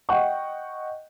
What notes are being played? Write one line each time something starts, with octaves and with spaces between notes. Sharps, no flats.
D#5 F#5 G5 C#6